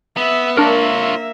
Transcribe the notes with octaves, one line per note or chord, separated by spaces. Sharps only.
B3 E5
A#3 D4 F4 A#4 C#5 E5